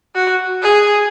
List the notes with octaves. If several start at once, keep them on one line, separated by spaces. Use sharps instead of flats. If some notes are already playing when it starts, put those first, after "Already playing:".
F#4
G#4